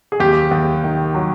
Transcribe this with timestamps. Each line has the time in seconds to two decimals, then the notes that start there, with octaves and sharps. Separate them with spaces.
0.12 G#4
0.20 D#2 G4
0.51 D#2
0.84 D#3
1.14 F#3